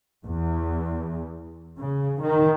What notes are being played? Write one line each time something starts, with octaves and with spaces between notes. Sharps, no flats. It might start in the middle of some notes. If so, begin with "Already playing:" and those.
E2
C#3
D#3